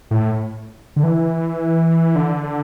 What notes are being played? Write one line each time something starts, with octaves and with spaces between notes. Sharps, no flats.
A2
D3
E3
D3
D3